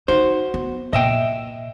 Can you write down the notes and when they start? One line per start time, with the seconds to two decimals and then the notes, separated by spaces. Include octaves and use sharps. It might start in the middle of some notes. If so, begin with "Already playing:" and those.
0.08 D#4 F#4 C5
0.54 B3
0.93 A#2 D#5 E5 G5